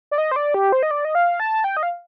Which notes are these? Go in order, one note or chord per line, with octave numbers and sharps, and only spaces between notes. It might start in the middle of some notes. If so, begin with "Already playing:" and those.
D5
D#5
C5
D5
G4
C5
D#5
D5
D#5
F5
A5
G5
D#5
F5